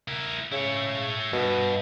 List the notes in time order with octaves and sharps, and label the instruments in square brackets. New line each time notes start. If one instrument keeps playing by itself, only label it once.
[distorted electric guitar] E4 A#4
[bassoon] C#3 [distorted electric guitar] E4 C#5
[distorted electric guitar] G2 [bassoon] B2